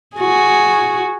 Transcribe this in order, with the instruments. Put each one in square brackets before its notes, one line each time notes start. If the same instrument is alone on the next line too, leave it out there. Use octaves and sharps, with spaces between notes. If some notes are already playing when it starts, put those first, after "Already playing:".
[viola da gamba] F#4 G#4